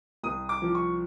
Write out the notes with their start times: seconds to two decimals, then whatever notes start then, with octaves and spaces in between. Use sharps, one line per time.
0.23 C2 D#6
0.49 D6
0.62 F3
0.75 C#6